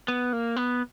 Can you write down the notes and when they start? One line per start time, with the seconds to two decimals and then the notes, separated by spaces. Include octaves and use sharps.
0.08 B3
0.33 A#3
0.56 B3